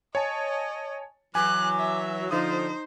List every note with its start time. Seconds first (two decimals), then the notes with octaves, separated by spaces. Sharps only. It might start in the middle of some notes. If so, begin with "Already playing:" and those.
0.15 C#5 D#5 G#5 A5
1.35 E3 F#3 G#5 D6 F#6
1.79 E5
2.31 D3 F3 D#4 C5 D#6